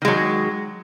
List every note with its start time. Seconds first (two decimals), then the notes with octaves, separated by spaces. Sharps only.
0.02 D#3
0.05 G#3
0.08 F#3